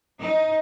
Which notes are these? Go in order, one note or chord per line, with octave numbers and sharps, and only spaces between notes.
D#4